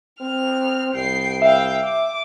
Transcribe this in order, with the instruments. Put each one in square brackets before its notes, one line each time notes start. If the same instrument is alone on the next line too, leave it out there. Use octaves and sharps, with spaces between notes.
[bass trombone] C4 [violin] F6
[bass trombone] C2 [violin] G5 C7
[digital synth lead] E5 [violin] F5 G5
[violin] D6